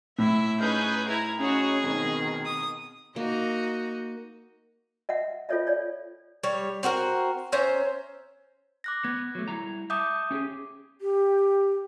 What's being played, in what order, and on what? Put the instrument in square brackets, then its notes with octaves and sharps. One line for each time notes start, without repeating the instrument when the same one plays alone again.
[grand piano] A2 [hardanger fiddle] E4 E5
[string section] C#4 D#4 G6 [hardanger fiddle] G#4 B4 [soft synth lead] F6
[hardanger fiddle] E4 A#5 [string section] G#6
[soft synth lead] C#4 [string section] D#4 F#4 C#5 [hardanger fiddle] G#4
[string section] B2 D#3 [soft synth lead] C4
[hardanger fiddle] D#6
[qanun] A#3 [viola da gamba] D#4 F#4
[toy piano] D#5 E5 F#5
F4 A4 C5 C#5 D#5 E5
C#5 D5
[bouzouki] G3 C#5
C4 F#4 A4 A#4
C#4 C5 E5 A#5
[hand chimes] D6 F#6 A#6
[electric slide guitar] B3 [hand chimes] G#6
[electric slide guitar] F#3 A3
G3 E4 A#5
[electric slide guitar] E5 A5 [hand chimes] D6 D#6 G6
[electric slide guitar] C#4 G4 G#4
[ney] G4